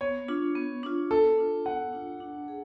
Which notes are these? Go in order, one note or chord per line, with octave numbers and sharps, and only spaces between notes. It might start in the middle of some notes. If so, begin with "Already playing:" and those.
B3 C#5
D4 F4
B3
D4 F4
B3 A4
D4 F4
B3 F#5
D4 F4
D4
G#4